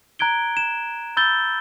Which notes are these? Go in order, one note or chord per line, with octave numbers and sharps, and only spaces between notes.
A#5 F#6 G#6 D7 G7
E7
B5 E6 G6 A6 G7